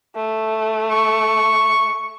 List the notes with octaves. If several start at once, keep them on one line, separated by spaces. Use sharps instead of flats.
A3
C#6